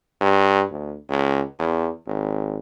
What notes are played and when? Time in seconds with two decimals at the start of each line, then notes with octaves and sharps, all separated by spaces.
0.21 G2
0.71 D2
1.09 C#2
1.59 E2
2.06 G#1